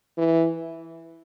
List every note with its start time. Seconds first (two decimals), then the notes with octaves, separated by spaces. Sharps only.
0.18 E3